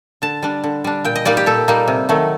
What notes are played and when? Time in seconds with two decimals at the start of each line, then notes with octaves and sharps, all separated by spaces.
0.22 D3 A5
0.43 G3 D4
0.64 D3
0.84 G3 D4
1.05 A#2 G5
1.15 D#5
1.25 G3 A#3 D#4 D5
1.37 G4
1.46 A#2 A4
1.68 G3 A#3 D#4
1.88 C3
2.09 D#3 F#3 A3